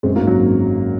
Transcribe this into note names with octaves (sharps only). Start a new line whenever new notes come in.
F#2 G#3 C4
F#3 A#3
G#1
F#3